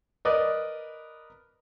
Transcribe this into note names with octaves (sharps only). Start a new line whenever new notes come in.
A#4 B4 D5 D#5